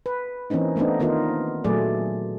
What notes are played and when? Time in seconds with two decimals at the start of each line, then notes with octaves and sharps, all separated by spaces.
0.06 B4
0.50 E3 A#3 C4 C#4 D#4
0.76 A3 B3 C4 D4 D#4
1.00 D#3 A#3 B3 D#4 F4
1.64 A#2 F#3 A3 G#4 D5